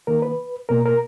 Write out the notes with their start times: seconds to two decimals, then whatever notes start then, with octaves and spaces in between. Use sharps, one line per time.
0.07 D#3 A#3 A#4
0.22 B4
0.69 B2 A#3 A#4
0.85 A#4